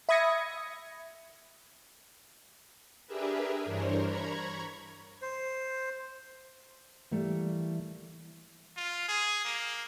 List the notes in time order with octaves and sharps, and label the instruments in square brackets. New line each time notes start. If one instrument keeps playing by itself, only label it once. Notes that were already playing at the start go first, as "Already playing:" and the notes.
[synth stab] E5 B5 D#6 G#6 A#6 C#7
[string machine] D4 G4 G#4 A#4 B4 E5
G2 E3 D4 A#4 C5 C#5
A#5 B5 C#6 G#6
[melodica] C5
[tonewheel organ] E3 [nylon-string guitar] G3 A3 A#3
[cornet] F4
G#4
A#3